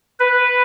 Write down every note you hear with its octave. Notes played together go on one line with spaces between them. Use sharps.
B4